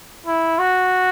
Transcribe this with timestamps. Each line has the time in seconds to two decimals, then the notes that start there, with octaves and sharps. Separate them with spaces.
0.26 E4
0.59 F#4